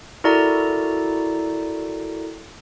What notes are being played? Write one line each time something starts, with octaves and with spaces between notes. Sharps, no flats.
E4 F#4 A4 A#4 D5 A#5